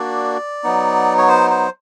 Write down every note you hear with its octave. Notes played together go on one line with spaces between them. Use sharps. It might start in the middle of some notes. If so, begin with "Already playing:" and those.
Already playing: A#3 D4 F#4 D5
F#3 B3 D#4
C#5
C5
C5